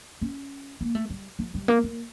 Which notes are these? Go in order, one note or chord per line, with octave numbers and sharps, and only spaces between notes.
C#4
A#3
A3
G3
F3
G3
A#3
A#3